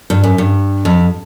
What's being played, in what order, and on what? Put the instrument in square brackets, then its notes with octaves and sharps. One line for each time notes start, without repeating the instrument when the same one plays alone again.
[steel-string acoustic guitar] G2
F#2
G2
F2